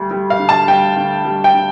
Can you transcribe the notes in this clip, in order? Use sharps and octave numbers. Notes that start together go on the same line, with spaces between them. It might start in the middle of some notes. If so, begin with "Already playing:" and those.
Already playing: D2 G3
G3
F5
D3
A5
G3 G5
D3
G3
G5
D3